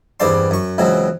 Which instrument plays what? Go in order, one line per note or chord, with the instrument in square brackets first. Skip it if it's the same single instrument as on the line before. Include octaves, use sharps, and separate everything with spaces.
[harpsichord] E2 G2 C4 G4 D5 C6
F#2 C#6
C#2 B2 E3 F#3 C4